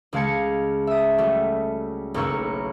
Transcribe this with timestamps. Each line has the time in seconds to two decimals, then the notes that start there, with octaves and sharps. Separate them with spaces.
0.13 C#2 G#3 F5 A5 G#6 C#7
0.87 E5 D#6
1.18 F#3 G3 A3
2.14 F#1 B1 A#3 B3 C#6 E6